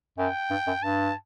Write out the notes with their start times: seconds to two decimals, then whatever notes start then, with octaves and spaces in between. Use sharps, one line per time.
0.18 F#2 G5
0.50 G2
0.67 F#2
0.82 G2 A5